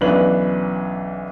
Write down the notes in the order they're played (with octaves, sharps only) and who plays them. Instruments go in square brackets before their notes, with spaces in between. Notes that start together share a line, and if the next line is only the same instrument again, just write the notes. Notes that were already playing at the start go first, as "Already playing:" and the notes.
[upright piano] B1 E3 C#4 D4 B4 F#7